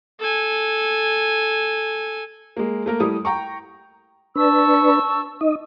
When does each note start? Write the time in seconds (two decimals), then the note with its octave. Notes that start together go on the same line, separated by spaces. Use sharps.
0.20 A4 G#5
2.57 G#3 A#3
2.86 A3 A#3 A#4
3.00 G3 A3 E4 D#6
3.25 G5 A#5 C#6
4.35 D4 B4 A5 C#6 E6
5.41 D#4 D#5